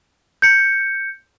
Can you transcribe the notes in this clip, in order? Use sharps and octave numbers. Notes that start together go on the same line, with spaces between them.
G6 C#7